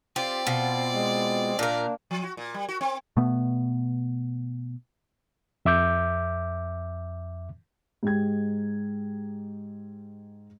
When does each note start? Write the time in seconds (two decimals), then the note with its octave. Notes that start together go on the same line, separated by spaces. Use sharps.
0.16 C4 F4 G4 D5
0.47 B2 F4
0.93 G#3
1.59 A#2 A#3 D4 A#4
2.11 F3
2.23 F#4
2.37 A#2
2.54 G3
2.69 F#4
2.81 C4
3.17 B2 A3 B3
5.65 F2 E5 D6 G6
8.03 G#2 G#3 G4 G5 G#6